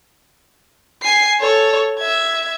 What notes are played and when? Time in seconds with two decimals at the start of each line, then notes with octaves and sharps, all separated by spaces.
1.02 G#5 C7
1.40 A4 C#5
1.99 E5 G#6